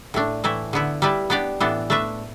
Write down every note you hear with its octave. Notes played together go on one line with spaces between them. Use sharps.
A2 A3 D4
A2 E3 A3 E4
D3 B3 E4
G3 E4 B4 D5
B3 D4 G4 D5
A2 E3 B3 D4 A4
A3 D4 B4 E5